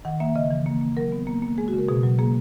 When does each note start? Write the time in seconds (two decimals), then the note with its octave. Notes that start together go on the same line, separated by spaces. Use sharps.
0.05 D#3 F#5
0.20 A#3 E5
0.35 C#3 D#5
0.50 E3
0.66 A#3
0.81 A#3
0.97 F#3 A#4
1.12 B3
1.27 A#3
1.42 A#3
1.58 G#3 G#4
1.68 F#4
1.73 C#3
1.78 A#4
1.88 B2 G#4
2.03 F#3
2.19 A#3 G#4